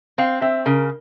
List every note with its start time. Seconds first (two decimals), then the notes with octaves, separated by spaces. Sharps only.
0.18 C4 F5
0.41 C4 E5
0.66 C#3 A#4